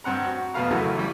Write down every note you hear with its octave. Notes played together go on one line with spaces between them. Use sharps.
G2 C4 F#5 A#5
F#4
F2 B2 B4 F5 A#5
F#2 C#3 E3 A3 F#4
E3 G3